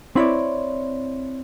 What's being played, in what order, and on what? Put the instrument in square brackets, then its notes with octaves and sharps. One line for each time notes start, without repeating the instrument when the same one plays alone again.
[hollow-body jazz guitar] C4 E4 C#5 D5